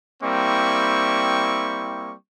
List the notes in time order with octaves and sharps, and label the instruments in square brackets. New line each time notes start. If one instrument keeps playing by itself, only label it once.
[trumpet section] G3 A#3 C4 E4 C#6